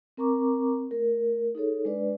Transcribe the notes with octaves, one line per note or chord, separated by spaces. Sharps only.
C4 A#4 A#5 C#6 D6
A3 A#4
D#4 G#4 A4 C#5
G#3 D4 B4 D5